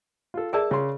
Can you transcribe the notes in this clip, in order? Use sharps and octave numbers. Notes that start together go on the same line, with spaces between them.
F4 A4
G#4 A#4 D5 E5 A5
C#3 C6